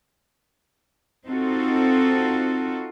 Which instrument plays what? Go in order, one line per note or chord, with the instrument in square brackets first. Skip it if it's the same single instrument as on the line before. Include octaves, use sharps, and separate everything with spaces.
[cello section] C4 D#4 F4 F#4 A4